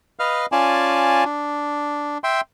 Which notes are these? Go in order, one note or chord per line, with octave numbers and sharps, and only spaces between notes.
B4 D#5 F5 F6
C#4 F4 D5 G#5 A5
D4
E5 G5 C6